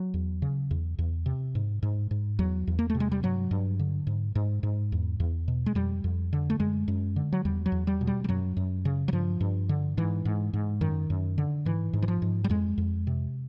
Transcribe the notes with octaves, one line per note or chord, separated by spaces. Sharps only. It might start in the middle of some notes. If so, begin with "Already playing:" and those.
Already playing: F#3
E2
C#3
E2
E2
C3
G#2
G#2
G#2
E2 F#3
E2
A#3
A3
C3
G#3
G3
G2 F#3
G2
D3
G#2
G#2
G#2
E2
E2
B2
G#3
F2 G3
F2
D3
A3
F#2 G#3
F#2
D3
F#3
E2 G3
F#3
E2
G3
B2
G3
G3
F#2 F#3
F#2
C#3
F#3
G2 F3
G2
D3
G#2 E3
G#2
G#2
F#2 D#3
F#2
D3
G#2 E3
G#2
E3
F3
G#2
G3
F2 G#3
F2
C3